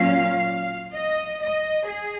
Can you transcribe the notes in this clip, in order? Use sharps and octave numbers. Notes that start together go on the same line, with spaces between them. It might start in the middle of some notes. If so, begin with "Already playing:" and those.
Already playing: A#2 F#3 C#4 F5
D#5
D#5
G#4